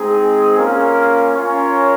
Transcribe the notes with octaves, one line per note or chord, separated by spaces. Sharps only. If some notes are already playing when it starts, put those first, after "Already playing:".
Already playing: G#3 C4 D#4 G#4
A#3 C#4 F4 A#4 F5
C#4 F4 A#4 C#5